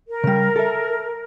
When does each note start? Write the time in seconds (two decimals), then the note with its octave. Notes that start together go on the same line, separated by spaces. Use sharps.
0.08 A#4
0.24 C#3 G3
0.56 A4 E5